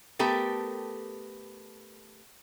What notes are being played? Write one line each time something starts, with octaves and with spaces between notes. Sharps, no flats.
A3 B3 G4 A4 A#4